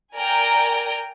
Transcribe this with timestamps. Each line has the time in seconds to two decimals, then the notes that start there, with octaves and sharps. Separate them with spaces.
0.16 A#4 D5 G5 G#5 A#5